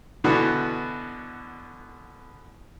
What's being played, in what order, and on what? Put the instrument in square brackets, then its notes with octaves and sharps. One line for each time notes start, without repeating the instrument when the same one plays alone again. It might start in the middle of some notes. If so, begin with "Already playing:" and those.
[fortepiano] B2 D3 E3 B3 F#4